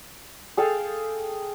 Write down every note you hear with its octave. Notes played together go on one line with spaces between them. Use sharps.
G#4 A4 F5 G5